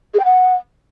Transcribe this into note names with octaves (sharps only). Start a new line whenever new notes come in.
G#4
G5
F#5